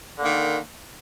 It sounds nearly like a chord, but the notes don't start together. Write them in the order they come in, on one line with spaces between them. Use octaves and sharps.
D3 A#3 D#3